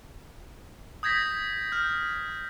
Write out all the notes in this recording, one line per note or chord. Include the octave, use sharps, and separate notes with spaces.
D#6 G6 G#6 A#6 B6
F6 G6